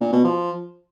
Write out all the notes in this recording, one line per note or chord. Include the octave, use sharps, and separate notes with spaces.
A#2
B2
F3